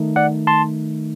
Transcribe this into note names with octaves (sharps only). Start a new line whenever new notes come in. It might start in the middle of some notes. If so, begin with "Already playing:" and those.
Already playing: D#3 A3 D#4
D5 F#5
A5 C6